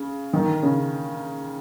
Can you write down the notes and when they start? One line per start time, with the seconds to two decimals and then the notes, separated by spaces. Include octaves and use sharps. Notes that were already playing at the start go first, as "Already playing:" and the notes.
Already playing: C#3
0.33 D#3
0.63 C#3